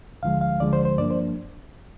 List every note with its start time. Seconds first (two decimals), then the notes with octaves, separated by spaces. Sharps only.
0.23 D2 D3 F3 G#3 F5
0.41 F5
0.60 D2 D3 F3 G#3 D5
0.73 C5
0.85 C5
0.98 G2 F3 A#3 D4 D5
1.10 C5